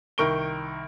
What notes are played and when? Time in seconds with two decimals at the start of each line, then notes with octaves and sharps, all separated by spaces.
0.18 C2 D#3 A#4 C#6 D7 G7